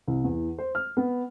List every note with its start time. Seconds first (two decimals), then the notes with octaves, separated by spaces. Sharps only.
0.07 C2
0.24 E2
0.58 C5
0.75 F6
0.97 B3